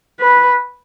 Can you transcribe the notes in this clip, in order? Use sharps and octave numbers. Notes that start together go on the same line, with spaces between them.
B4